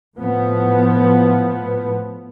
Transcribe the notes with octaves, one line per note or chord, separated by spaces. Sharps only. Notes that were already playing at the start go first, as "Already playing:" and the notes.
A2 F3 B3